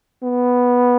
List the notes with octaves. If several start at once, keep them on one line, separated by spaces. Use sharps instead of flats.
B3